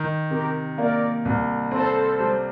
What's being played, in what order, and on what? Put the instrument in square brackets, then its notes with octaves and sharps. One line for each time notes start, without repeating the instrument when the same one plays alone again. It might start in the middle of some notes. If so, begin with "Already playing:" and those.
Already playing: [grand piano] D#3
[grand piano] C3 [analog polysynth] G4 A#4
[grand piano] A#3 [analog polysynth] A#4 D5
[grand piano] C2
[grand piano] C4 [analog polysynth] A4 C5
[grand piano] G3